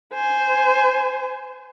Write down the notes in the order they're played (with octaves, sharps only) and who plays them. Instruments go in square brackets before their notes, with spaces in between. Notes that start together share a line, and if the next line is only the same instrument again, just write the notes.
[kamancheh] C5 G#5